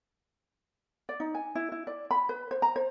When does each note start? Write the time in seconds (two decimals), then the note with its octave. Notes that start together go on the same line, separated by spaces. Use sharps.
1.09 D5
1.20 D#4
1.35 G#5
1.55 E4
1.72 E4
1.87 D5
2.11 B5
2.29 B4
2.51 C5
2.62 A#5
2.76 C5